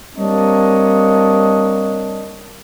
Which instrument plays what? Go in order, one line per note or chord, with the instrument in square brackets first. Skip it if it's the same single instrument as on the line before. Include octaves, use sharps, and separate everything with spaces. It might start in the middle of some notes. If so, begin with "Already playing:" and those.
[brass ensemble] G3 A#3 C4 D4 C#5 D#5